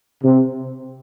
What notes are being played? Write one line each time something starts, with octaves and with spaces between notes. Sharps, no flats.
C3